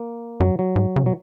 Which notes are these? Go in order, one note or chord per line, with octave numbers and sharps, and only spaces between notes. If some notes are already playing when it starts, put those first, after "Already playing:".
Already playing: A#3
F#2 F#3
F#3
G#2
C#3
B2 F#3